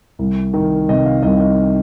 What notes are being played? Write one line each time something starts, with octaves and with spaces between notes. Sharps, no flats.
C2
D#3
C3 D#5
F5
C2 D#5
D#5